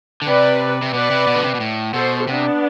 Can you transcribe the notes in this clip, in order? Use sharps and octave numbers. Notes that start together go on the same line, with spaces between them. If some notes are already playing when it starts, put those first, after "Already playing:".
D3
C3 B4 D5
C3
B2 B4 D5
C3
B2
D3
C3
B2
A2
B2 A4 C5
C3 B3 D4